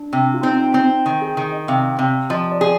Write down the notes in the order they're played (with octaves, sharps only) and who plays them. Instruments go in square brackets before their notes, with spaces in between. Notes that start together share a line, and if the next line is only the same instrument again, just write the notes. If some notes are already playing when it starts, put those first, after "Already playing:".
Already playing: [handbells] D4
[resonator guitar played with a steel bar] C3
[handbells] F4
[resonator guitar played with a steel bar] C4 [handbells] D#4
[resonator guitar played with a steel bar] C4
D#3
[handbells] G#4
[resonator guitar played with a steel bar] D#3
[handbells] D#5
[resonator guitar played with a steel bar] C3 [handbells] F5
[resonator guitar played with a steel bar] C3
[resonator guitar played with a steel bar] F3 [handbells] D#5
[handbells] D5
[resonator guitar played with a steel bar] G#4